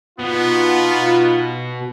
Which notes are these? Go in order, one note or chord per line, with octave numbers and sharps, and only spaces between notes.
B2 B3 D#4 F4